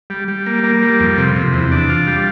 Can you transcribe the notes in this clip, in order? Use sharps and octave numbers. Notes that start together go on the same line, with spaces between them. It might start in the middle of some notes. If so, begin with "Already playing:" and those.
G3
G3
A#3
A#3
G3
F2
C3
C3
E2
D4
F4
G3